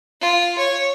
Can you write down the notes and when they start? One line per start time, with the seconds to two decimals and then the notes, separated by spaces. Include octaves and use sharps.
0.21 F4
0.59 C#5